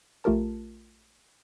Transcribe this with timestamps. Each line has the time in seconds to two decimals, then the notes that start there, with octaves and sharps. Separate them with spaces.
0.24 A#1 A3 F4 G4 A#4 A5